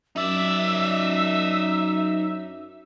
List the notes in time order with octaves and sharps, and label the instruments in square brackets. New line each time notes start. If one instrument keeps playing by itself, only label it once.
[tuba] F#2 [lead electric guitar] D#4 D5 [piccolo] E5